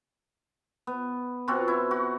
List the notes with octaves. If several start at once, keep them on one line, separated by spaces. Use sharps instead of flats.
B3
B2 C4 F4 F#4
E4
F#4